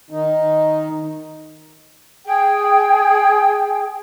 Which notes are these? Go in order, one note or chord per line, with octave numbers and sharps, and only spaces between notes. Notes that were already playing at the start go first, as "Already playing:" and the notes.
D#3 D#4
G#4 G5